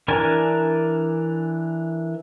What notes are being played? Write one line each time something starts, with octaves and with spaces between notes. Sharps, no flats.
E3 D4 A#4 G#5 A5